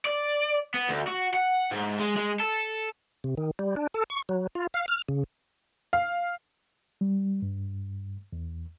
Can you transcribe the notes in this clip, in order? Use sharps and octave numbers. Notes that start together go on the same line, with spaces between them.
D5
B3
D2
F#4
F#5
G#2
G#3
G#3
A4
C3
D#3
G3
D4
A4
C#6
F#3
F4
F5
F6
C#3
F5
G3
G2
E2